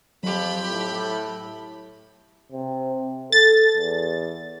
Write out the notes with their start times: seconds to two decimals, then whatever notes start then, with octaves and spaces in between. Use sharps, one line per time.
0.23 F2 F#3 G4 B5
0.71 A2
2.52 C3
3.32 A4 A6
3.76 E2